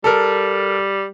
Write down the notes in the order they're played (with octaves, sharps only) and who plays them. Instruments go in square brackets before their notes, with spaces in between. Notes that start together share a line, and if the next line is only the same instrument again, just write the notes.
[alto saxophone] G3 [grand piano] A4 A#4